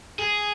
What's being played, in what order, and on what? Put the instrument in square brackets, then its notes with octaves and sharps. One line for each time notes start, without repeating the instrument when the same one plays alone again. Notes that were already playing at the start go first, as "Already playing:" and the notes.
[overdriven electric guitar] G#4